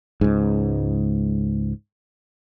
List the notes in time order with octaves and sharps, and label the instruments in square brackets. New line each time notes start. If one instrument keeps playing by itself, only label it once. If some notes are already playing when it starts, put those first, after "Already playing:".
[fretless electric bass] C#2 G#2